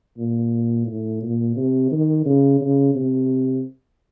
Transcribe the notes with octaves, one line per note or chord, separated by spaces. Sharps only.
A#2
A2
A#2
C3
D#3
C#3
C#3
C3